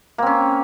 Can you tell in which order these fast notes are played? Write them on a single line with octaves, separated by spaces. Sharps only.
A#3 C4 C#4